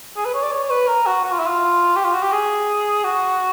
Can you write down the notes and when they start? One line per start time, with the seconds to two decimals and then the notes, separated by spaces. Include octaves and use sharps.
0.16 G#4
0.25 B4
0.34 C#5
0.43 D5
0.52 C#5
0.70 B4
0.88 A#4
1.06 F#4
1.24 F#4
1.32 F4
1.39 E4
1.47 F4
1.96 G4
2.05 F4
2.13 F#4
2.23 G4
2.32 G#4
3.04 F#4